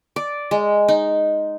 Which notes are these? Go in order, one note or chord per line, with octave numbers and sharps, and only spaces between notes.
D5
G#3
D#4